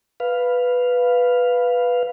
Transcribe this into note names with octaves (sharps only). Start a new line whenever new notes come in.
B4 F5